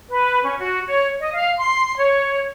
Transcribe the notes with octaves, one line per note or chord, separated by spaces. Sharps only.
B4
C#4
F#4
C#5
D#5
F5
C6
C#5